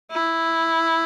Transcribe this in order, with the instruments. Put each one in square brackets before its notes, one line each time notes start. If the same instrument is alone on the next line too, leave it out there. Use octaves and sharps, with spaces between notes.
[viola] E4